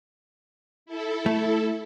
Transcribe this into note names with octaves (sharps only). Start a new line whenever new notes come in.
E4 A4
A3